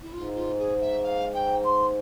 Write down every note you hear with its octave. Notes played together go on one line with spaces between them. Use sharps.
E4
G#2 F4
F4
G#4
E5
F5
G5
C6